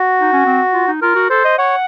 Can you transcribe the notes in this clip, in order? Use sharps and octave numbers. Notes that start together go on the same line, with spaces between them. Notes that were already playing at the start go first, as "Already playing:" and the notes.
Already playing: F#4
D#4
C#4
C4
F4
D#4
F4 A#4
F#4
A4 C5
D#5
C#5 F#5